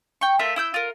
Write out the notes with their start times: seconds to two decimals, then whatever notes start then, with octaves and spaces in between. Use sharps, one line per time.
0.21 G5 C#6
0.39 A3 F4 A#4 E5
0.56 E4 E6 G6
0.74 F4 A#4